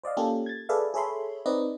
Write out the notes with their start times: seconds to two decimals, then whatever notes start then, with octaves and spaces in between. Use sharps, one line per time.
0.03 C5 D5 D#5 F5
0.17 A#3 C#4 F4 G4 A4
0.46 G#6 A6
0.69 G#4 A4 B4 D5 E5 F5
0.94 G#4 A4 C#5 E5 B5 C6
1.46 C4 D#4 B4 D5 D#5